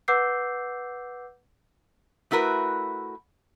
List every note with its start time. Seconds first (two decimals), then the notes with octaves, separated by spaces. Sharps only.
0.08 B4 F#5 D6 E6 G6 C7
2.31 A3 E4 F#4 A#4 B4